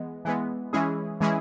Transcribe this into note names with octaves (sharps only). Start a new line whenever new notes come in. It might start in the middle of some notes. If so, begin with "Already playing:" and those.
Already playing: E3 G#3 B3
E3 G#3 B3
E3 G#3 C#4 E4 G#4
E3 G#3 C#4 E4 G#4